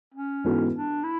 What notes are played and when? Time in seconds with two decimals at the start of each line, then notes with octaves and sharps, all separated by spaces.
0.15 C#4
0.44 G#2 E3 B3 F#4 A4
0.74 D4
1.04 E4